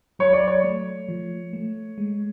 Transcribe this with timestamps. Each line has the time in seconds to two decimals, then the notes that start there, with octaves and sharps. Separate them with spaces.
0.19 F#3 C#5
0.33 D5
0.48 C#5
0.64 A3
1.09 F3
1.53 A3
1.98 G#3